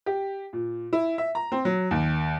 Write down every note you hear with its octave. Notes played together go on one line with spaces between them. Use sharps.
G4
A#2
E4
E5
A#5
C4
F#3
D#2